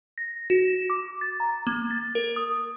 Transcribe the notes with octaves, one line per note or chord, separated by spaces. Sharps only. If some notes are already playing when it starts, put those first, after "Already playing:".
A#6
F#4
D6
A6
A#5
A#3
A6
A#4
D#6